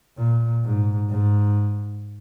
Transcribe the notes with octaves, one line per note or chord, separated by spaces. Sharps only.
A#2
G#2
G#2